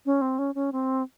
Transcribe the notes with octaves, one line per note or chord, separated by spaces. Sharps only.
C#4
C4
C#4
C#4
C4